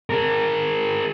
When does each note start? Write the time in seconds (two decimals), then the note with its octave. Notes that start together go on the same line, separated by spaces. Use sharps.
0.10 G#4 A#4